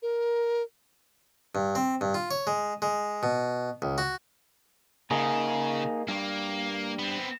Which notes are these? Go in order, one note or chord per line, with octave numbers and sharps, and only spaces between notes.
A#4
G2
C4
G2
F4
C#5
G#3
G#3
B2
C#2
F#4
C#3 A#3 D#4 G#4
G2 A#3
B3 C4